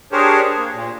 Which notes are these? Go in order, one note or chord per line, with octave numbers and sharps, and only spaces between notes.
D4 G4 G#4 A#4 C5 C#5
A#3
A#2